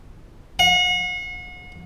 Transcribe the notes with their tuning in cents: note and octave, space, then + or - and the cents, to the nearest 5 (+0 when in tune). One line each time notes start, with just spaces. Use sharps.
F#5 -40